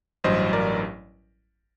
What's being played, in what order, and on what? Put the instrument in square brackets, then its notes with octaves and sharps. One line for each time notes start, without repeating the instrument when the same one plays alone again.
[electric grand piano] A1 G2 F#3 C5 D#5
A#4 D5